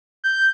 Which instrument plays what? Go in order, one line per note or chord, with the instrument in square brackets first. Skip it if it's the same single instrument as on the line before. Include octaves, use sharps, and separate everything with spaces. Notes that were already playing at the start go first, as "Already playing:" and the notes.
[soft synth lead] G6